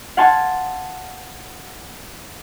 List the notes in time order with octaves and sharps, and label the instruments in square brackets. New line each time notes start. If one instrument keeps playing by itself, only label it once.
[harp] F5 F#5 G#5 A5 C6